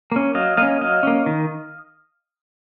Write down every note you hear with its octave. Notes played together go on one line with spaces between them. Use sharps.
A#3 C#4
F#3 D#5 F5
A#3 C#4 D#5 F5
F#3 D#5 F5
A#3 C#4
D#3